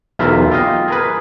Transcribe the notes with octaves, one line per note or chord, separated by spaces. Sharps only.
B1 E2 F4 A#4 B4 E5
F4 G4 D#5 F5
G#4 A#4 B4